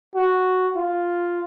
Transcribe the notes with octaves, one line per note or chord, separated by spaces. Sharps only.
F#4
F4